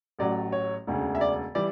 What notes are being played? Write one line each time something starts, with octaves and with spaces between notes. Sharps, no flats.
A1 A2 F#3 D5
C#5
E1 D2 C#3
E5
D5
E3 G3 D5